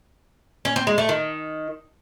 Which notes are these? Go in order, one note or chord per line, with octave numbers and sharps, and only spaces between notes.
C#4
C4
G#3
A3
D#3